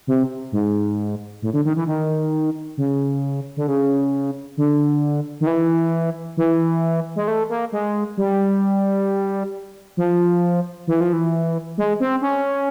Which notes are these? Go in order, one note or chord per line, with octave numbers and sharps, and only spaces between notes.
C3
G#2
A2
D3
D#3
E3
D#3
C#3
D3
C#3
D3
D#3
E3
E3
G#3
A3
A#3
G#3
G3
F3
E3
F3
E3
G#3
C4
C#4